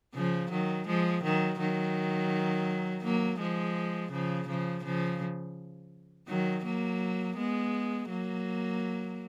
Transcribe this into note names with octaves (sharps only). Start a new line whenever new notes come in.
C#3 F3
D#3 F#3
F3 G#3
D#3 F#3
D#3 F#3
F#3 A#3
F3 G#3
C#3 F3
C#3 F3
C#3 F3
D#3 F#3
F#3 A#3
G#3 B3
F#3 A#3